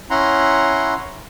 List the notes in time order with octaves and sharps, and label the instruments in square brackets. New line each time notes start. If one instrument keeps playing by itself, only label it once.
[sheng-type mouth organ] C#4 E4 F#5 A#5 C6